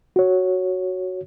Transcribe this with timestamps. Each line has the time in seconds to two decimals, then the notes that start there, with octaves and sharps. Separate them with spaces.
0.16 F#4 C#5